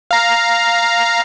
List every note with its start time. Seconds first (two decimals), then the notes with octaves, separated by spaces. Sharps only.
0.11 F5 A#5